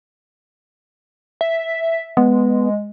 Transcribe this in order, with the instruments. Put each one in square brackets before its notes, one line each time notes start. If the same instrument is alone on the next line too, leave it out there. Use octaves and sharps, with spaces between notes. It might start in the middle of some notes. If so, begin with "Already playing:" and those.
[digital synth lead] E5
[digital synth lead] G#3 [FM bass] B3